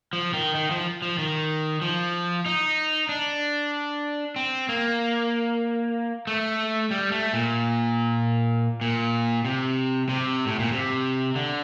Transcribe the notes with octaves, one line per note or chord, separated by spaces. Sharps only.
F3
D#3
D#3
F3
F3
D#3
F3
D#4
D4
C4
A#3
A3
G3
A3
A#2
A#2
C3
C3
A2
A#2
C3
D3